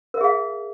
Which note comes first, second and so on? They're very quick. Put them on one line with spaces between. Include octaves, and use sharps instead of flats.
A#4 E5 G#4 F5